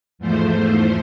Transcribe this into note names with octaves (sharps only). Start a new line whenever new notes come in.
E2 G#2 F3 A3 C5